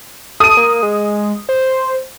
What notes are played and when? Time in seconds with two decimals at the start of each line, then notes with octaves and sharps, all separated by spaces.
0.40 A4 D#6 D#7
0.57 A#3
0.83 G#3
1.49 C5